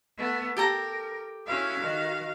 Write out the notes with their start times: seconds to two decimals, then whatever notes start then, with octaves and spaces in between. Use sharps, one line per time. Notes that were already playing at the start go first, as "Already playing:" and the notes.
0.18 A3 B3
0.57 G4 A4 A#4 A#5
1.47 C#4 E4 F#4 F5
1.79 D#3